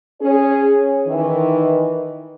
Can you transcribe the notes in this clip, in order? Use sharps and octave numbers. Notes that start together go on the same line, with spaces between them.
C#4 G#4 C#5
D#3 E3